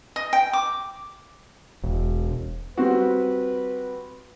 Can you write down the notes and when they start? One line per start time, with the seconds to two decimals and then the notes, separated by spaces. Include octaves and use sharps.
0.16 D#5
0.33 G5
0.53 D6
1.82 E1
2.77 G3 C4 F#4 B4